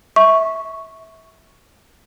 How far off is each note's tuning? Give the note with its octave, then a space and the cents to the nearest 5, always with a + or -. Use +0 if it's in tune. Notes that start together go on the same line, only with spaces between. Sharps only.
E5 -20 C#6 +0